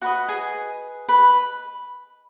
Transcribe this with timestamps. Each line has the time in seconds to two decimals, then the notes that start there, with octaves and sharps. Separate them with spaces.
0.01 F#4 B4 D#5 F#5
0.28 G#4 G#5
1.09 B4 B5